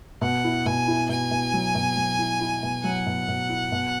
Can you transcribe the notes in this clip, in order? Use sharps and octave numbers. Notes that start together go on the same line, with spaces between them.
B2 F#5
E4
B2 G#5
E4
B2 G#5
B2
F#3
B2
F#3
E4
E4
B2
F#3 F#5
B2
B2
E4
B2